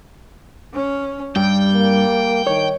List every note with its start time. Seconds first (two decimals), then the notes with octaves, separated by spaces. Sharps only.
0.73 C#4
1.36 G2 G3 G5
1.74 A#3
2.47 D#3 C#5